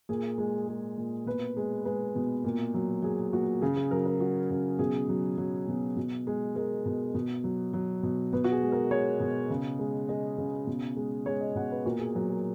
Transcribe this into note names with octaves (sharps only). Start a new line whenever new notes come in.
A#2 G#4
G#3
G#3
A#2
B2 B4
G#3
G#3 B4
B2
A#2
F#3
F#3 G#4
A#2 F#4
C#3 G#4
G#4
F#3 A#4
A#4
F#3 F#4
C#3
B2 G#4
F#3
F#3
B2
B2
G#3
G#3 A#4
B2
B2
F#3
F#3
B2
B2 B4
F#4
G#4
G#3
A#4
G#3 C#5
B2
C#3
G#3
G#3 D#5
C#3
B2
G#3
G#3 C#5
D#5
B2 F#5
B4
A#2 F#4
G#4
F#3 A#4
G#4